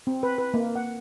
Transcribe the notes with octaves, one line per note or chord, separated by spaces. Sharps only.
C4
B4
B4
A#3
F#5